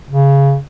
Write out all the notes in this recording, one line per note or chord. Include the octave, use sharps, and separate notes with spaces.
C#3